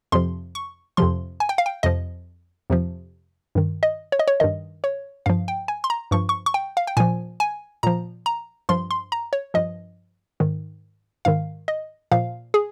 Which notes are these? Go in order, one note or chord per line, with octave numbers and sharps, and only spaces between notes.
F2 C3 F3 C6
C#6
F2 C3 F3 C6
G#5
G5
F5
G5
F2 C3 F3 D#5
F2 C3 F3
G2 D#3
D#5
C#5
D#5
C#5
G2 D#3 D#5
C#5
G2 F3 F5
G5
G#5
C6
A#5
G2 F3 C#6
C#6
C#6
G5
F5
G5
A#2 F3 G#5
G#5
A#2 F3 A#5
A#5
G2 F3 C6
C6
A#5
C#5
G2 F3 D#5
G#2 D#3
G#2 D#3 F5
D#5
A#2 F3 F5
G#4